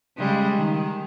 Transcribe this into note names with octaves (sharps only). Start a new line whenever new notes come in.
C#3 G3 G#3
D#3